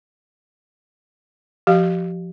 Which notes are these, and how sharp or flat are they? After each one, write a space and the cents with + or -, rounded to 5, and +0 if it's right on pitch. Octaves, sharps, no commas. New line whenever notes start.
F3 +0 G4 -35 F5 +0